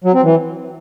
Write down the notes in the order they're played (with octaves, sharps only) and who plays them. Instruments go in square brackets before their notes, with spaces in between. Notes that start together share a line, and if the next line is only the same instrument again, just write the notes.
[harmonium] F#3
C4
E3